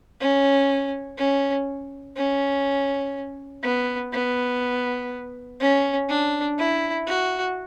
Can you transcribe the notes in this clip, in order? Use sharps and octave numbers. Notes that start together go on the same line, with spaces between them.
C#4
C#4
C#4
B3
B3
C#4
D4
E4
F#4